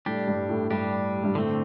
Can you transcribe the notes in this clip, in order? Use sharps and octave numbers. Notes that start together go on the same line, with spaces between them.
A2 G3 D4 G4
G2
A2
G2 G3 D4 G4
G2
A2 D3 A3 C4